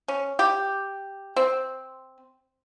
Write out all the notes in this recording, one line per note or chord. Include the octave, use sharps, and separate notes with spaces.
C#4
G4
C4